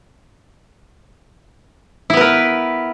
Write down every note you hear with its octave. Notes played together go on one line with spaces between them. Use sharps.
B3 E4 A#4 B4